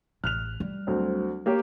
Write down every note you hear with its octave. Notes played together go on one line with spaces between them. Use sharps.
A1 F6 F#6 F7
G3
D2 F#3 C4
A#3 G4 C#5